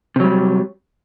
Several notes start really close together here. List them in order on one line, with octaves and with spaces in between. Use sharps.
C3 F#3 G3